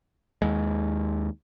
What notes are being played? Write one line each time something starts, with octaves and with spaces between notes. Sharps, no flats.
D#2 G#3